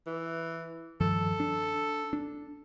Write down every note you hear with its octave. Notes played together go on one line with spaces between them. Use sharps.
E3
G2 D#3 F3 A4
D4
D4